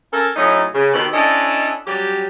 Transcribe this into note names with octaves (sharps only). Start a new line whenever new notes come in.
C#4 A4 A#4
A2 F#3 A3 C#4 D#4
C#3
B2 D#3 G4 A4 B4 C5
C#4 D4 E4 A4 D#5
F#3 G3 C#4 G4